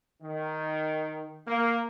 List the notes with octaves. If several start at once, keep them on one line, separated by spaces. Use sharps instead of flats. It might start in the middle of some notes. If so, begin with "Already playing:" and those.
D#3
A#3